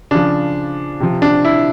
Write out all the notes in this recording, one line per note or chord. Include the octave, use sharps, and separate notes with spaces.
C#3 F3 D4
C3 F3
D4
E4